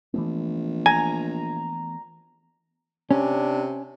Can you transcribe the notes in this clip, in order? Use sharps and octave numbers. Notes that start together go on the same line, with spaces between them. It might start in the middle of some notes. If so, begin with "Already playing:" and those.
A#1 E3 A3 B3
G#5 A#5
C3 C#4 D4